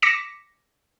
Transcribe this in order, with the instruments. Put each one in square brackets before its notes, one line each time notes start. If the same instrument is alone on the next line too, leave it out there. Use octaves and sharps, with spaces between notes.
[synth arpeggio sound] D6 A#6 B6 C#7 E7